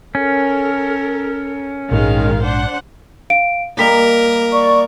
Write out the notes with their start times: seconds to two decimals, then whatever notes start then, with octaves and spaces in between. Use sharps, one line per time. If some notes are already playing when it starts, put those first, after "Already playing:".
0.15 C#4 A4 A#4
1.91 A#1 G#2 D#3 G#3 F5
2.44 D4 C5 F#5
3.30 F5 D7
3.79 G3 A#3 A#4 D#5 B6
4.52 D5 C#6